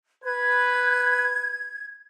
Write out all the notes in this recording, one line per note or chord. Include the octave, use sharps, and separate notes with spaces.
B4 G#6